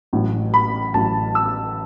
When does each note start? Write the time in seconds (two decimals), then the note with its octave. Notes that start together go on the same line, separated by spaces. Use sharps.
0.13 A1 A2 F#3
0.54 B5
0.94 A1 A2 F#3 A5
1.35 E6